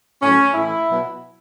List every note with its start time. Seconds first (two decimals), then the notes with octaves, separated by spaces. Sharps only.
0.22 A2 F#3 C#4
0.54 A2 E3 E4
0.87 B2 F#3